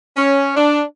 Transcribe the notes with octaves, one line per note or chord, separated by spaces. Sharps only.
C#4
D4